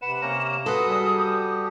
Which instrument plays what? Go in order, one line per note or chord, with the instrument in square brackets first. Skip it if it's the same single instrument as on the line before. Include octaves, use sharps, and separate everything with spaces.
[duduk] C3 [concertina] B4 F#5 [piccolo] E7
[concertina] A#3 C#4 A#5
[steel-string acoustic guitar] F#4 A4 [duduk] B4 [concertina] C6 [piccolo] D#6
[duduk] G3 [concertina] G#4
[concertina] G4